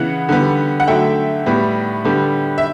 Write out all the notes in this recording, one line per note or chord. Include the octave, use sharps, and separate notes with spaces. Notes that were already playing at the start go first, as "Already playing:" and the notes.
Already playing: C#3 E3 B3 F#5
D3 G3 B3
F#5
D3 F#3 A3 E5 G5
A2 G3 B3
D3 G3 B3
E5